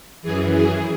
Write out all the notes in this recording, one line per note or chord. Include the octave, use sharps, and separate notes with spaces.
F#2 E3 G#4
G#4